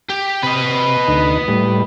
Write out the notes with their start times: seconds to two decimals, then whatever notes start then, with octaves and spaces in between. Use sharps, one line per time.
0.09 G4
0.43 C3 B4 D#5
1.08 D2 D#4
1.48 A2 G3